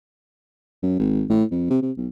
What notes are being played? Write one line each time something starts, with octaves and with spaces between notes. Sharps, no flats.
F#2
G#1
A2
F2
C3
C3
B1